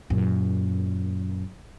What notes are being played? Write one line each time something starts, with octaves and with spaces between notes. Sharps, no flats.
F#2 A#2